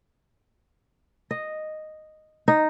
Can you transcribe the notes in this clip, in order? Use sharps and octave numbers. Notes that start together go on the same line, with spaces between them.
D#5
D#4